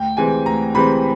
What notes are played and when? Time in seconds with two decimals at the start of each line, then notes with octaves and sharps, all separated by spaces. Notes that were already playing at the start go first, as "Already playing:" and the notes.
Already playing: D2 G5
0.17 C3 E3 G#3 C4 G#5
0.46 D2 A#5
0.74 C3 E3 G#3 C4 B5